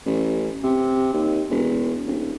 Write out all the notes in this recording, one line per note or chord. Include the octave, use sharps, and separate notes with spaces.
A1
C3
D#2
E1
D#1